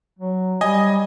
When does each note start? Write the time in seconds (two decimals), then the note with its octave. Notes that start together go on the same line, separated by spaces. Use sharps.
0.19 F#3
0.61 G3 D#5 G#5